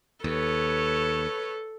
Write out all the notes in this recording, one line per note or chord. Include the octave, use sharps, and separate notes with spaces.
D#2 A4 B4 C#5